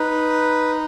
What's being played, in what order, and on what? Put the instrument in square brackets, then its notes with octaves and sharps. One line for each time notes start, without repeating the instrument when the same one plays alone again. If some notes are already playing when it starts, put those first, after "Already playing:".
Already playing: [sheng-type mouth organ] D#4 B4